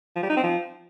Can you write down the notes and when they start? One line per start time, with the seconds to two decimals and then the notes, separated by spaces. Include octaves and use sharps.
0.16 F3
0.23 G3
0.30 D#4
0.36 C4
0.43 F3